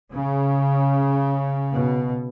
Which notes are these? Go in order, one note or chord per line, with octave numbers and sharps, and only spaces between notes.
C#3
B2